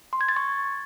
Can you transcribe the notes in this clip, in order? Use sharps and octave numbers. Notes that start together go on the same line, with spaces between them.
C6
G#6
A6
C#6